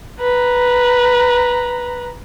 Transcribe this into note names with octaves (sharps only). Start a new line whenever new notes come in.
B4 A#5